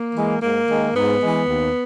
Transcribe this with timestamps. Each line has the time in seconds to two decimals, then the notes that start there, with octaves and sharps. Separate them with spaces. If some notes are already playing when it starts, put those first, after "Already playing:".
Already playing: A#3
0.14 E3 G#3
0.41 G#2 A#3
0.67 D#3 G#3
0.94 G#2 B3
1.21 E3 G#3
1.47 D#2